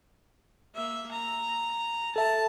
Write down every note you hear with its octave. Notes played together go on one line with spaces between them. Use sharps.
A#3 E5
A#5
A4 E5 A5